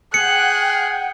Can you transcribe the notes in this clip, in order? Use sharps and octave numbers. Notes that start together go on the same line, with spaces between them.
G#4 F#5 G5 F#6 C#7